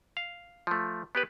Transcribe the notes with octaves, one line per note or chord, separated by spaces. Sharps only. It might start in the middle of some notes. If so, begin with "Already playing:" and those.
F5
F3 A3
B3 G4 B4